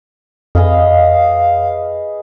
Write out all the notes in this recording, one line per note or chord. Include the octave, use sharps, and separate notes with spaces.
F2 G#4 B4 D#5 F5